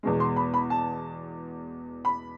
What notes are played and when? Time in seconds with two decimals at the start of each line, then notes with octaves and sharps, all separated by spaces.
0.03 E2 B2 G#3
0.20 C6
0.36 B5
0.54 B5
0.70 A5
2.05 B5